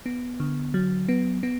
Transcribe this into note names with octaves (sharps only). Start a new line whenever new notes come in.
B3
D3
F#3
B3
B3